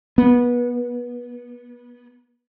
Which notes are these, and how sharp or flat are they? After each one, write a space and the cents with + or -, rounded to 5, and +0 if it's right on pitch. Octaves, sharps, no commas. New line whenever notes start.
B3 -25